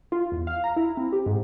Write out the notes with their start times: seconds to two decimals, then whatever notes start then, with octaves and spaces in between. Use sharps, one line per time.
0.12 F4
0.32 E2
0.47 F5
0.64 A#5
0.76 E4
0.97 C4
1.12 G4
1.26 G#2